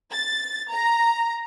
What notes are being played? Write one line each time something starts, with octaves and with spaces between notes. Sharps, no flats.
A6
A#5